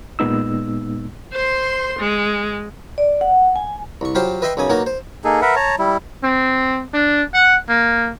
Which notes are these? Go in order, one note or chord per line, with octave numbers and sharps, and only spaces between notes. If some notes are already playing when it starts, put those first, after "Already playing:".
A#2 G#3 B3 D#4 E6
C5 C6
G#3
D5
F#5
G#5
C2 C#6
F#3 F4 G4 C5 B5 C6
B4 D#5 E5 G5 B5 C6
B1 F#2 C#3 G#5 D#6
B1 A#3 D#4 F#4 C#5
C5
A#3 D#4 G#4 A4
A#4 B4 E5 F#5
C#5 A5 A#5
G3 E4
C4
D4
F#5
A#3